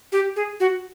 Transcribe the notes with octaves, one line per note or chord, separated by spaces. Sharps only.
G4
G#4
F#4